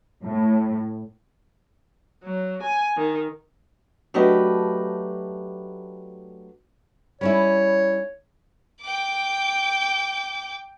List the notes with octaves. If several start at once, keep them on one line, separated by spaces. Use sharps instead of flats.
A2
F#3
G#5
D#3
F#3 A3 D4 G4 B4 D#5
G3 C#4 E4 C#5
G5 D6